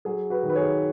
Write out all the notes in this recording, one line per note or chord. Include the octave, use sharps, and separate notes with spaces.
F#3 G#4
F#4 B4
D#3
B4
G#4 C#5